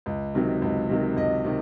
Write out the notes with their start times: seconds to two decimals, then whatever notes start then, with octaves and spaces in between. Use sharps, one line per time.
0.06 C#2
0.34 C3 D#3 F#3
0.62 C#2
0.89 C3 D#3 F#3
1.17 C#2 D#5
1.45 C3 D#3